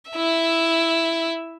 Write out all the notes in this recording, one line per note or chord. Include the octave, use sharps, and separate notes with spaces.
E4 E5